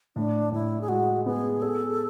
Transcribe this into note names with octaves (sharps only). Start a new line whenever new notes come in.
A2 D4
A2 E4
G#4
G#3 F#4
B3 G#4
G#4 A4